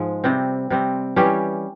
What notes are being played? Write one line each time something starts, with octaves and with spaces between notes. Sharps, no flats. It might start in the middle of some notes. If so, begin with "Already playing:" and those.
Already playing: G#2 F3 G#3
C3 G3 C4
C3 G3 C4
E3 G3 C#4 G4